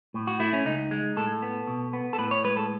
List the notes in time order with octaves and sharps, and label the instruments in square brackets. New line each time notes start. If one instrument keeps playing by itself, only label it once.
[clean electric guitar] A2
F#4
A3 E4
C#4
C#2 D#4
G#3
A2 A4
B3
B2
B3
A4
A2 B4
C#5
G#3 B4
A4